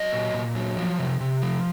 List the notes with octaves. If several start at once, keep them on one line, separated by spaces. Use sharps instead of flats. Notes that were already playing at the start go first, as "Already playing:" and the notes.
Already playing: F#3 D#5
A#2
A#2
F#3
F3
C3
C3
F3